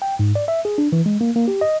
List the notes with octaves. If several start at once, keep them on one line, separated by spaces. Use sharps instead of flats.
G5
G#2
D5
E5
G#4
D4
E3
G#3
A#3
A#3
G4
D#5